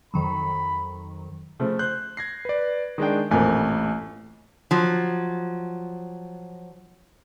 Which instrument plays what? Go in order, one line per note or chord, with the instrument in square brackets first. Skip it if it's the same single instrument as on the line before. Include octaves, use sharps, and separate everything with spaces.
[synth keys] F2 D#3 F#3 [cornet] B5
[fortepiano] C#3 F3 A3
[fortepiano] C5 [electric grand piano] F#6 G6
[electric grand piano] G#6 A#6 C7
B4 D5
[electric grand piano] D#3 G#3 D4 [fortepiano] D#5 G5
[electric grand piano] A1 A3 G#5 [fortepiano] F2 A#2 A#4
[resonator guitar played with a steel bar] F3 F#3